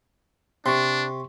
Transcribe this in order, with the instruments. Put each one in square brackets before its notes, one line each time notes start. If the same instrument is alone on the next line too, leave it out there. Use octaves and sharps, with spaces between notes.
[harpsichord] C3 [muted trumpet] D4 [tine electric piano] C6 C#6